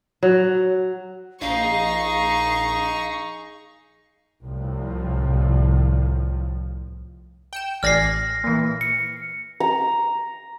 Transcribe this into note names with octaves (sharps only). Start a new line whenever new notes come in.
F#3
A#1 D#4 G#4 D#5 F5 C#6
C2 A2 F3
G5 C#7 E7
A1 D5 G#5 F6 A#6 C7
A#2 E3
C#7
A#5